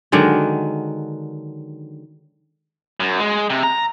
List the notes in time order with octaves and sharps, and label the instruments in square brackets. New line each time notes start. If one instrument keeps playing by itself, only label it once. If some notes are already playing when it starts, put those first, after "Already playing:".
[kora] D3 D#3 F#3 G#3
[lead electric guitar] F#2
G#3
C3
A#5